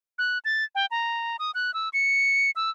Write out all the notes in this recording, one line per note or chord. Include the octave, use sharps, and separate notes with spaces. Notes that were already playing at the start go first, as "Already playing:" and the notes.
F#6
A6
G5
A#5
D#6
F#6
E6
C#7
E6